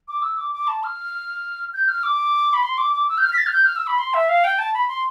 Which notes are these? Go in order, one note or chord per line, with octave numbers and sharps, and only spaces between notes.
D6
E6
D6
D6
A5
F6
G6
F6
D6
B5
C6
D6
D6
E6
G6
F6
B6
A6
F6
G6
F6
E6
B5
C6
E5
F5
G5
A5
B5
C6